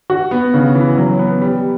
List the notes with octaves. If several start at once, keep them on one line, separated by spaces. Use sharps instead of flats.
F#4
B3
C#3
E3
F#3
B3
G3